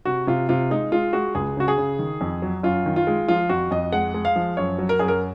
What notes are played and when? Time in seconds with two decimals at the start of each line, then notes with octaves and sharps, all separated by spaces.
0.05 C3 F#4
0.27 C3 F4
0.49 C3 F4
0.70 G#3 D#4
0.92 G#3 F4
1.13 G#3 F#4
1.35 C#2 G#4
1.57 C#3 F#4
1.68 G#4
1.78 C#3
1.99 D#3
2.21 F2
2.42 F#3
2.63 F#2 F4
2.86 D#3
2.96 F4
3.07 G#3
3.28 F3 F4
3.49 F2 F#4
3.71 F2 D#5
3.92 G#3 F#5
4.14 G#3
4.25 F5
4.36 F3
4.57 F#2 C#5
4.79 F#3
4.89 A#4
4.99 F#2 G#4
5.08 A#4